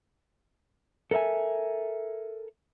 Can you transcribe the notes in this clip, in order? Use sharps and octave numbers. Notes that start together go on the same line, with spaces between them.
A4 A#4 D#5 E5 G#5